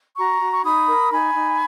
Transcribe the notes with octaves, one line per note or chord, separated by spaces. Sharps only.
F#4 A#5 C#6
F#4
C#6
D#4 B5 D#6
A#4
D#4 G#5 B5
D#4